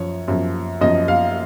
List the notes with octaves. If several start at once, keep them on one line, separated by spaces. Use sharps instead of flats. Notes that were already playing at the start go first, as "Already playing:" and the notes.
Already playing: F#2 F3 C#5
F#2 F3
F#2 F3 D#5
F5